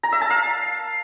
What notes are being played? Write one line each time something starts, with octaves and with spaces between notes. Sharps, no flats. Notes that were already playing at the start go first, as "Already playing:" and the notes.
A#5
E5
A5
F5